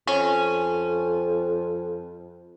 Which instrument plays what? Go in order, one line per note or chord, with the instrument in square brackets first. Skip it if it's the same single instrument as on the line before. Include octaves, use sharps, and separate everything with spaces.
[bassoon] F2 [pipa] C#4